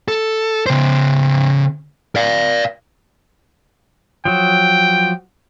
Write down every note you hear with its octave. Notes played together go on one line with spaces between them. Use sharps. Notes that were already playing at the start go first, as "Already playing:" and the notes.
A4
C#3 C5
D5 F5
F3 F#3 G5